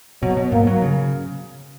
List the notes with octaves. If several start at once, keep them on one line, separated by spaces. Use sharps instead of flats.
B2 F#3
B2
G#2 A#3
F#3
C#3